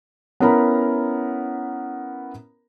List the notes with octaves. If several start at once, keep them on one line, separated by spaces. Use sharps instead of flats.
B3 C#4 E4 A#4 A#5 B5